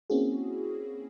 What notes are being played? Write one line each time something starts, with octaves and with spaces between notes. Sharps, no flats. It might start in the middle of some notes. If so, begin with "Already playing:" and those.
A#3 C4 C#4 E4 F#4 G#4